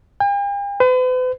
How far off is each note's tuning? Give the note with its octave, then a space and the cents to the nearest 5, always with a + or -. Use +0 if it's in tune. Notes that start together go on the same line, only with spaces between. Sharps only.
G5 +45
B4 +45